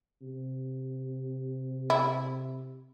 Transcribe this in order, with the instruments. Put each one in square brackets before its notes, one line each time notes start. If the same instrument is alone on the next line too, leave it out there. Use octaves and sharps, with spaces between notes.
[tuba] C3
[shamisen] E4